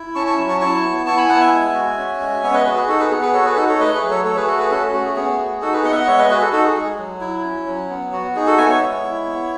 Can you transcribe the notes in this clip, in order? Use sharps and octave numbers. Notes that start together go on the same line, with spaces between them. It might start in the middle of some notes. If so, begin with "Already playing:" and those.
Already playing: E4
C#4 A5 C#6
A5 C#6
F#3
A5 C#6
E4 A5 C#6
B3
E4 A5 C#6
G#5 B5
B3 F#5 A5
E5 G#5
G#3
F#4
C#4
G#3
B3 C#5 E5
B4 D#5
F#4 G#4 B4
G#4
D#4 F#4 A4
G#4 B4
B3 G#4
G#4 B4
F#4 A4 C#5
G#4 B4
D#4 F#4 A4
A4 C#5
A3 B4 D#5
G#4 B4
F#3
A4 C#5
A3 A4 C#5
G#4 B4
F#4 A4
G#4 B4
C#4 F#4 A4
A3 F#4
G#4
B3 G#4
F#4
D#4 F#4 A4
G#4 B4
B3 D#5 F#5
E5
D#5 F#5
G#3 C#5 E5
B4 D#5
F#4 G#4 B4
F#4 A4
D#4 F#4 A4
G#4
G#3 G#4
F#3
E4
C#4
F#3
B3
F#4
D#4 G#4
F#4 A4
B3 E5 G#5
C#5 E5
G#3
E4
B3